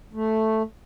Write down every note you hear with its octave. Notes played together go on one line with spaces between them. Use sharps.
A3